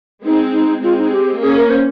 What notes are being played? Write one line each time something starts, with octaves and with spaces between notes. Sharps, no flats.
G#3 C4 D#4
D#4
G#3 C4 F4
D#4
G4
A#3 C#4 G#4
A#4
C5